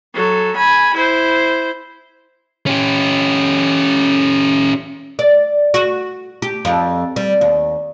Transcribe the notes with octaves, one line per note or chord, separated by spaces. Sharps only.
F#3 A4
G#5 B5
E4 C5
C#4 G4
D5
F#4
G4
F2
G3
D#2